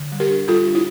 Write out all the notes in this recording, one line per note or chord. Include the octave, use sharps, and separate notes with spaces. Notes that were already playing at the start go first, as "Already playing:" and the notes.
Already playing: D3
G3
G4 A#4
D4
G3 F4 A4
D4
E4